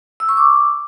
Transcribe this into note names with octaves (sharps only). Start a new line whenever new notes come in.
E6
C#6
D6